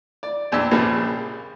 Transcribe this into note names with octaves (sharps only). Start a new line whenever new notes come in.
D5
A#1 E2 D4 G4 E6
A#1 C#3 F3 G3 A#3